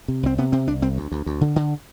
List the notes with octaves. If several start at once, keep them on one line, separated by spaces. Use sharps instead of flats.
C3
C2 C4
C3 B3
C3 C4
C2 D4
C2 C4
D2
D2
D2
D3
D3